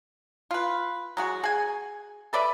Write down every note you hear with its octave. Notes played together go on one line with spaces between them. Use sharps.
F4 B4
F#3 G#3 F#4
G#4 G#5
A4 B4 D5 E5